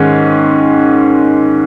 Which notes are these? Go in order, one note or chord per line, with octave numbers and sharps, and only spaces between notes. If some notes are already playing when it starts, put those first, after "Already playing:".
Already playing: G#2 D#3 G#3 C#4